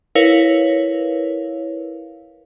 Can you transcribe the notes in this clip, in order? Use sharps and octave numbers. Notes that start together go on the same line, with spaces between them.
E4 A#4 B4 C#5 F5